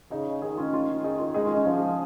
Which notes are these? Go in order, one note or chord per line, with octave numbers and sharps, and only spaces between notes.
C#3 D#4 G#4
D#3 D#4 G#4
C#4 F4
C#4 F4
D#4 G#4
F4 A#4
G#3 D#4 G#4
C#4 F4
C#4
F3 C#4 F4